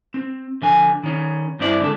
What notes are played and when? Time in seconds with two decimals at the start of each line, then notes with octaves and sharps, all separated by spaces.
0.14 C4
0.62 D3 F3 G#5
1.03 D#3 C#4
1.59 G2 C4 E4 D5
1.80 D3 G#3 A4